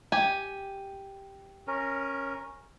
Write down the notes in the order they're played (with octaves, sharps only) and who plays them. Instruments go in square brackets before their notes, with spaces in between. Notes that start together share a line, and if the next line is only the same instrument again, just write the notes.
[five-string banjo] G4 [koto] G#5
[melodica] C#4 A#4